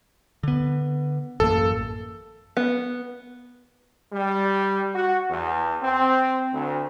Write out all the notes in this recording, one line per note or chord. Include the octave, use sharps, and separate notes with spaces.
D3 B3
A1 F#2 A#3 A4
B3
G3
F#4
E2
C4
D2